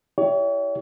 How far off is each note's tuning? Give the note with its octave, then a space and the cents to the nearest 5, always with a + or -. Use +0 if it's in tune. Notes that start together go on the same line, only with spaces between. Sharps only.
E4 +0 G4 +0 C#5 +40